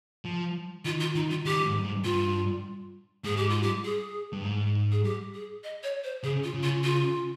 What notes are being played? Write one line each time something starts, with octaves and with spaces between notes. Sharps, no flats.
F3
D#3 F4
F4
D#3 D#4
F4
D#3 G4
G#2
G#2
G2 F4
G#2 G#4
G4
F4
G4
G#4
G2
G#2
G#4
G4
G#4
D#5
C#5
C5
C#3 G#4
F4
C#3
F4
F4